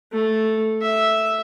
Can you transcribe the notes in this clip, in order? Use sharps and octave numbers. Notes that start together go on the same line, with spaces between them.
A3
E5